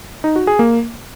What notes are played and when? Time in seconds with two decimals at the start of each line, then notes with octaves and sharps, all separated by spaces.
0.24 D#4
0.36 F#4
0.47 G#4
0.59 A#3